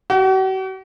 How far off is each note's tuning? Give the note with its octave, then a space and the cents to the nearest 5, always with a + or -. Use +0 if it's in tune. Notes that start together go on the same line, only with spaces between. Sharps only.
F#4 +45